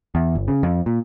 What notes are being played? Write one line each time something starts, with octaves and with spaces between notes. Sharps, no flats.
E2
G1
C#3
F2
A#2